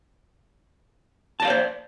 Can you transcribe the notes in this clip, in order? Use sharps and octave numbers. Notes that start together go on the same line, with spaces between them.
C5 D5 D#5 F5 A5